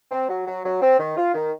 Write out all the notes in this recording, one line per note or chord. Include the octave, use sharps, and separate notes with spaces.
C4
F#3
F#3
F#3
C4
D#3
F4
D#3